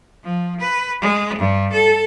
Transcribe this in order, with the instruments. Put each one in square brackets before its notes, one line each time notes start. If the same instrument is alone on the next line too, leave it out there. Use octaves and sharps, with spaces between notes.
[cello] F3
B4
G#3
G2
A4